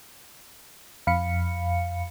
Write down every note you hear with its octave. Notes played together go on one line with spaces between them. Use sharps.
F2 F5 B5 C#7